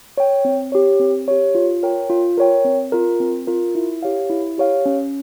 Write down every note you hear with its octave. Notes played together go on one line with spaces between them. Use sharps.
C#5 G5
C4
G4 C#5
C4
G4 C#5
F4
A#4 C#5 G5
F4
A#4 C#5 G5
C4
F4 A#4
C4
F4 A#4
E4
G4 C#5 F5
E4
G4 C#5 F5
C#4